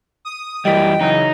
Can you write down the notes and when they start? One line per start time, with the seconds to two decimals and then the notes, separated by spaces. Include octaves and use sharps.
0.25 D#6
0.65 F#2 E3 G3 D#5 G5 B6
1.01 C#3 E3 F#3 D#4